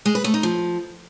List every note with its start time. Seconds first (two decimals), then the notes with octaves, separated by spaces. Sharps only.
0.05 G#3
0.15 B4
0.24 A3
0.34 D#4
0.43 F3